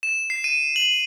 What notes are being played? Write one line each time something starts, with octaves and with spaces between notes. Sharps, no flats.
E7
C7
D#7
F#7